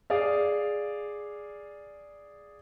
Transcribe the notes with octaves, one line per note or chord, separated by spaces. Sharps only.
G#4 D5 F5